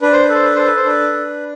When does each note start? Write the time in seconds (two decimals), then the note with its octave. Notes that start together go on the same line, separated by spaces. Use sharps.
0.02 D4 B4
0.13 C5
0.23 B4
0.29 A4 C5
0.44 B4
0.55 A4 C5
0.65 B4
0.76 C5
0.85 D4 B4
1.13 D4